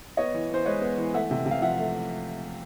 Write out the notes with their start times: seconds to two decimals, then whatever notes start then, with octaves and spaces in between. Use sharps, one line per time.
0.17 B3 C#5 D#5
0.34 E3
0.50 E3 C5
0.65 G#3 B4 C#5
0.81 B3
0.98 E3
1.14 A3 E5 F#5
1.31 C3
1.46 C3
1.51 F5
1.62 F3 E5 F#5
1.78 A3